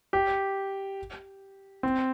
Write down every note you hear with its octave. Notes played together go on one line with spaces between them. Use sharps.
G4
C4